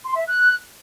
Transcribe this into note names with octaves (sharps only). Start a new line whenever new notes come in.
C6
E5
F#6